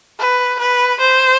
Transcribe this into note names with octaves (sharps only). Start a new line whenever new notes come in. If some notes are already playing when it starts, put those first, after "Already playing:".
B4
B4
C5